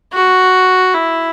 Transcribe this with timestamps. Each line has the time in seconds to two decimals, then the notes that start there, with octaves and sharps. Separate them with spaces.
0.13 F#4
0.94 E4